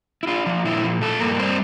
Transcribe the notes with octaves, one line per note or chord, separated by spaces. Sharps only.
E4
D4 F4
F3 F4
A#2 E4
F3
F3 A3 A4
G2 A#3 A#4
G3 C4 C5